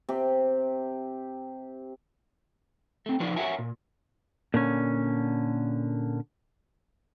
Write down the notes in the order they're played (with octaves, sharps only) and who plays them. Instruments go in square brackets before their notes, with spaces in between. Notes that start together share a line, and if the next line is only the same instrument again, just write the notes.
[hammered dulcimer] C3 G4
[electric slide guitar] A3 C4
F3 D4 D#4 F4 B4 D5
F#4 A#4 C#5 E5 F#5 G#5
A#2
A#2 D3 C#4